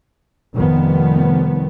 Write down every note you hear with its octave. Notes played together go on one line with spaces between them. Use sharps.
F1 D#3 F3 G3 B3